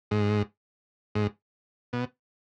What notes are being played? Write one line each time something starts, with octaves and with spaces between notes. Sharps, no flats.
G#2
G#2
B2